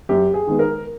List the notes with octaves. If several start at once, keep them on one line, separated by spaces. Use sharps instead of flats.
F#2 G4
G#4
D#3 G#3 B3
A#4